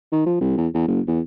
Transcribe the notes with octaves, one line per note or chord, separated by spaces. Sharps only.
D#3
F3
C2
E2
E2
F#1
E2